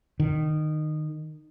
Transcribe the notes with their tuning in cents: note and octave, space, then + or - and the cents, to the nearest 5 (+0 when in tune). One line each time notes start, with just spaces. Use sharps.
D#3 -20